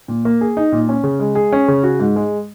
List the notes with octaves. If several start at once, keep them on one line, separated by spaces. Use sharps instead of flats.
A#2
A#3
G#4
D#4
A#2
C#4
C#3
G#3
G#4
C#4
C#3
F#4
G#2
G#3